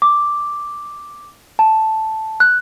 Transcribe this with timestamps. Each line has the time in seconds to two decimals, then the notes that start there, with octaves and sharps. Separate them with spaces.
0.02 D6
1.59 A5
2.40 F#6